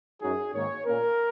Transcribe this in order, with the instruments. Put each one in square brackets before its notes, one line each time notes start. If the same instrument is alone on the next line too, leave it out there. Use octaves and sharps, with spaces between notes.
[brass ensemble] F#2 F#3 D#4 G#4
G#2 D#3 A#3 C#5
A#2 A#3 C#4 A#4